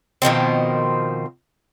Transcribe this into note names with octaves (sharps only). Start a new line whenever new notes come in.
B2 D#3 F3 C4